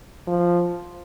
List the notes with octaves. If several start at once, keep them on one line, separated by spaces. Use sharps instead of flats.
F3